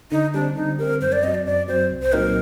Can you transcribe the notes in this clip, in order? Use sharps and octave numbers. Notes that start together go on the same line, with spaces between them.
D3 D#4
G3 C4 D4
D3 D#4
G3 C4 A#4
F#2 C5
D5
F#3 C4 D#5
D5
F#2 D5
F#3 C4 C5
C2
C5
A#2 F#3 C4 D#4 A#4